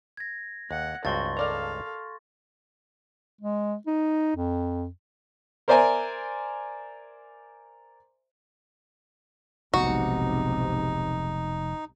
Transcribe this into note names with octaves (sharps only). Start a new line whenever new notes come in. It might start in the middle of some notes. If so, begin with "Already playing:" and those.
G#6 A#6
D#2 F#5
C#2 G2 C4 F#4 C6 C#6 A6
A4 A#4 D5 F5 A#5
G#3
D#4
F2
A#4 C5 D5 E5 G#5 A#5
F1 B1 G#2 C3 B3 D#4 F#4